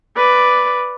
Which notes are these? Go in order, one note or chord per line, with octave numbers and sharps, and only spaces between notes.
B4 D5